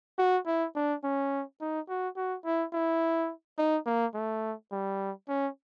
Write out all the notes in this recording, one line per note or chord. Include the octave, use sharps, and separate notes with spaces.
F#4
E4
D4
C#4
D#4
F#4
F#4
E4
E4
D#4
A#3
A3
G3
C#4